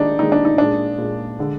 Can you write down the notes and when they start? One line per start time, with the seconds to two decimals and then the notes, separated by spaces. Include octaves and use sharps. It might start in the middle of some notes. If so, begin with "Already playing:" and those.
Already playing: D#3 G#3 D4 D#4
0.19 D#3 G#3 D#4
0.32 D4
0.45 D#4
0.58 A#2 G#3 D4
0.98 A#2 G#3
1.38 D3 G#3